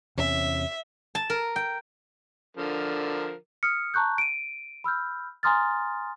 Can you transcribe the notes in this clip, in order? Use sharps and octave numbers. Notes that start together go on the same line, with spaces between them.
E2 C3 C#4 E5
A5
A#4
G5
D3 F3 A#4
D#6 F6 C#7
A5 A#5 C#6 F#6 G6
D7 D#7
B5 E6 F6 G6
G#5 A#5 C6 D#6 F6 A6